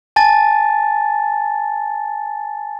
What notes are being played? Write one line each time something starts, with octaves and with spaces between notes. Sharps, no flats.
G#5 A5 A6